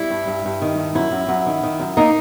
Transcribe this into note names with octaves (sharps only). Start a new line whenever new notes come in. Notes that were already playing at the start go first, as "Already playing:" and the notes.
Already playing: G3 E4
G2
G2
G2
D#3
G2
F#2 E4
F#2
F#2
D#3
D#3
F#2
A#3 D#4